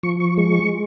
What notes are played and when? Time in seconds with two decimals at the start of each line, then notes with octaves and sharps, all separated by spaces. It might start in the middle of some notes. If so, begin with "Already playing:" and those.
0.03 F3 C#6
0.20 C#6
0.37 G#3 C#6